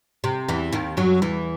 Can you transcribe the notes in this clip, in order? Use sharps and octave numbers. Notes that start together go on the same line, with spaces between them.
C3
E2 E3
D#2 D#3
F#2 F#3
E2 E3